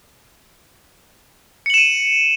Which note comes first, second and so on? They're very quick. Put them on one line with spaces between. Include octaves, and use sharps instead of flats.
C#7 F#7 E7 D#7